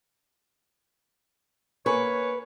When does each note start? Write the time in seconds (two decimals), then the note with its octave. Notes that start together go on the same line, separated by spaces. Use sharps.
1.86 A#3 B4 C#5 G#5 C#6